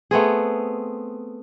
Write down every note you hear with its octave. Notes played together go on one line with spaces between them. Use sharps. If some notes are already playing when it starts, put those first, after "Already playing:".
A3 B3 C4 G#4